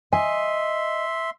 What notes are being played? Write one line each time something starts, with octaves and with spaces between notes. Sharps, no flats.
D#5 E5 G#5 C6